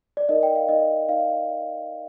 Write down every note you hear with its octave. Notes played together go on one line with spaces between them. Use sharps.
D5
D#4 A#4 D5 D#5
G5
F5
D#4 A#4 D5 D#5
D#4 F5